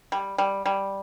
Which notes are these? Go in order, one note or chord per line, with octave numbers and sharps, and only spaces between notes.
G3
G3
G3